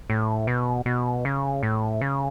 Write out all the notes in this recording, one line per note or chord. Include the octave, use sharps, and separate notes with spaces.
A2
B2
B2
C#3
A2
C#3